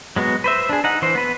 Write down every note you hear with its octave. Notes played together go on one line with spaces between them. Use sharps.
F#3 G#3 B3 F#4
B4 C5 E5
D4 G#4
D#4 F#5
E3 C5
B3 B4